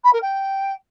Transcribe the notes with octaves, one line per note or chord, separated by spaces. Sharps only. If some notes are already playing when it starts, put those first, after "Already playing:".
B5
A#4
G5